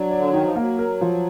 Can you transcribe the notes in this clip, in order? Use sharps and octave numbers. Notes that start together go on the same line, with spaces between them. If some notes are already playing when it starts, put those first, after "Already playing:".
Already playing: F#3 D4
D5
D3
D#3 D#4
F3
F#3 A#3
A#4
F3